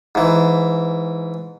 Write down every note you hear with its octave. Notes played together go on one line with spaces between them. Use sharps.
G#2 E3